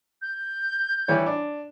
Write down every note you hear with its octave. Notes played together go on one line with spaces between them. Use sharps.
G6
E3 G3 C#5
D4